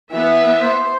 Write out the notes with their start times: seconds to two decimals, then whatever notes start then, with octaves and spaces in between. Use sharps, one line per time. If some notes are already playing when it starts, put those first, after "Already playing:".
0.12 E3 B3 E5
0.60 C5